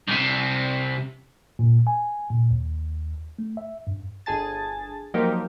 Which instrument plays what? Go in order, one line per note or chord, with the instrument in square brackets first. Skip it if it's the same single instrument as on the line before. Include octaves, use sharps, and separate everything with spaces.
[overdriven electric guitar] C2 C3
[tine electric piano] A#2
G#5
A#2
D#2
A3
E5
G2
[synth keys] G1 G#4 G#5 A5 A6
F3 F#3 A#3 D#4 G4 A#4